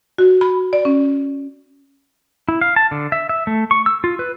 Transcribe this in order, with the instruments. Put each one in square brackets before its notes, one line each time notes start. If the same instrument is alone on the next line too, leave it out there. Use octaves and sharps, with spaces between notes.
[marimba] F#4
B5
D5
C#4
[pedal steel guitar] E4
F5
A5
D3
E5
E5
A3
C#6
E6
F4
B4